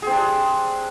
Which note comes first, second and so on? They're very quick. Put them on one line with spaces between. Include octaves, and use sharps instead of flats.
G#4 C4 D4 G4